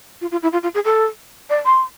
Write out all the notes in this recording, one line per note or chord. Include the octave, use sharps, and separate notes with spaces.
F4
F4
E4
F4
F4
G#4
A4
D5
C6